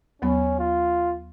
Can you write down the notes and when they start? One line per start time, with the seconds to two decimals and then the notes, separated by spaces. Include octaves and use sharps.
0.22 D#2 F#3 B3 C#4
0.59 F4